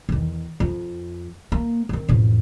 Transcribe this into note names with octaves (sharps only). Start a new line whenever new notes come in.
E2 D#3
F2
A#3
D#3 C4
A1 F2